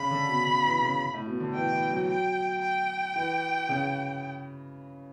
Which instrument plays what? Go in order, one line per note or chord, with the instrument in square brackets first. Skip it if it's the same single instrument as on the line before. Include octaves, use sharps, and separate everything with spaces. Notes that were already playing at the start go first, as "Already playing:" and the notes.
Already playing: [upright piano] C#3 [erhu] B5
[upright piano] D3
B2
C#3
E3
C#3
A2
B2
D3
[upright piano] E3 [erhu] G5
[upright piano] E3
F#3
[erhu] G5
G5
[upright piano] E3
C#3